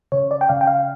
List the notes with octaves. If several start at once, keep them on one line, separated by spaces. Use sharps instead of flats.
C#3 C#5
D5
G5
C#3 F5
G5
F5